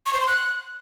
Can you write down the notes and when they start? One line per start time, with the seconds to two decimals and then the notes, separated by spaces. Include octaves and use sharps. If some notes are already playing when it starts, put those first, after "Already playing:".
0.06 C#6
0.13 C5
0.20 C6
0.27 F#6